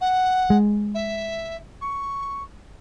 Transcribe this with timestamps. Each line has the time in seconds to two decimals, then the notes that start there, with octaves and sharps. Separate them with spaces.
0.01 F#5
0.50 G#3
0.95 E5
1.81 C#6